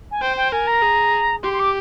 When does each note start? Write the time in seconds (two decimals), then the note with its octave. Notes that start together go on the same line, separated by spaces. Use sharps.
0.11 G#5
0.21 C5 G5
0.36 G5
0.52 A#4 G#5
0.67 A#5
0.82 G#4
1.43 G4 C6
1.53 C6
1.59 D6